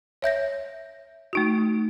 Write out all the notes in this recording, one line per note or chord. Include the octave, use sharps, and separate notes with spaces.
C#5 E5 G6 A#6
A3 D#4 F#4